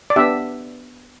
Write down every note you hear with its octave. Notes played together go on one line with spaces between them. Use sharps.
D5
B3 D4 G4 E5